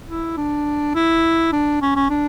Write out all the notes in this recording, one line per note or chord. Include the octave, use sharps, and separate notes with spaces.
E4
D4
E4
D4
C#4
C#4
D4